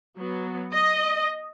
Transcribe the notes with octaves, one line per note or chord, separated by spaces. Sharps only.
F#3 B3
D#5